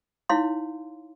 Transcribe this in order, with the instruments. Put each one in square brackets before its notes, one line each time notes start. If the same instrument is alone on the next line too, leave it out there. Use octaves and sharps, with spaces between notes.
[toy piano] D#4 E4 C#5 F5 C6